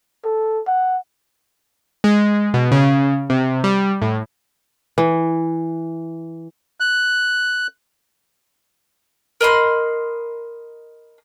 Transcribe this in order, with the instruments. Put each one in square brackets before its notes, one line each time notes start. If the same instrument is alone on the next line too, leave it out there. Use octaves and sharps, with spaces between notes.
[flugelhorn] A4
F#5
[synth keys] G#3
B2
C#3
C3
G3
A2
[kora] E3
[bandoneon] F#6
[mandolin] A#4 D#5 B5 C6